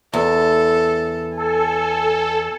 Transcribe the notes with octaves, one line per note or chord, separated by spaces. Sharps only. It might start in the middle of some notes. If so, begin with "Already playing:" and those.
E2 A4
A4 G#5